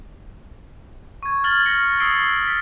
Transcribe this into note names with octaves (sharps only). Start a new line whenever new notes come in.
C#6 G#6
F6 G#6 A6 F#7 G7
F6 A#6 C#7
D#6 E6 A6 C7 D7 G7
B6